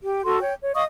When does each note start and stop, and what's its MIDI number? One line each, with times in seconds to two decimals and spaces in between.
0.03 0.24 67
0.24 0.39 66
0.24 0.39 69
0.24 0.39 84
0.40 0.53 73
0.40 0.53 79
0.61 0.72 73
0.74 0.84 75
0.74 0.84 77
0.74 0.84 85
0.74 0.84 87